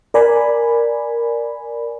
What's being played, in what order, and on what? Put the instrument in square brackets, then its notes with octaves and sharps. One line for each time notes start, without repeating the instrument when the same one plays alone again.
[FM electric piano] A#4 D5 G#5 B5